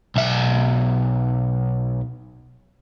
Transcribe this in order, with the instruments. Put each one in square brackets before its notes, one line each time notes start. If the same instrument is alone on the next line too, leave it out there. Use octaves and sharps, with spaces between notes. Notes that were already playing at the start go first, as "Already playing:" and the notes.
[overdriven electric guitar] B1 E5